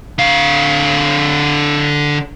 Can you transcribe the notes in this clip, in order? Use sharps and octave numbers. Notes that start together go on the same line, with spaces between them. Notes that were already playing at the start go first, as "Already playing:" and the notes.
D3 F5